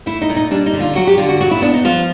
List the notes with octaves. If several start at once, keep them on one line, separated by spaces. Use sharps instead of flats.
A3 E4
D#4
A#2
D#4
G3 D4
D#4
D3
F4
F#3 F#4
G4
D3 F4
F#4
A#2 F#4
E4
B3 D4
D#4
F3 F4